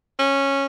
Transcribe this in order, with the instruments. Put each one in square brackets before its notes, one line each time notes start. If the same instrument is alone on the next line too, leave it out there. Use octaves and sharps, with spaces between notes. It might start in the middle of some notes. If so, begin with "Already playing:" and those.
[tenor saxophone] C#4